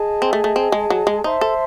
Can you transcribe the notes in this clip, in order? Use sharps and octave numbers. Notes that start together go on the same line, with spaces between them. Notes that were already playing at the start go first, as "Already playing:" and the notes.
Already playing: G#4 D#5 A5
C4
A3
A3
C4
G#3
F#3
G#3
D#4 C5 E5 A5 C6
A4